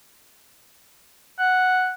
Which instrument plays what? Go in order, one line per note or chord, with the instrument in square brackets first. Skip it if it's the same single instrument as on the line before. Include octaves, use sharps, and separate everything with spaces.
[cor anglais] F#5